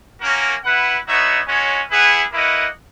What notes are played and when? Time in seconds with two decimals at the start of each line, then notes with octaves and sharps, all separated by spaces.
0.21 A#3 C#4 F#4 A#4
0.64 E4 B4 F#5
1.06 B3 D#4 F#4 C#5 E5
1.47 G#3 C#4 F#4 C#5
1.89 E4 G#4 B4 F#5
2.32 A#3 E4 B4 D#5 F#5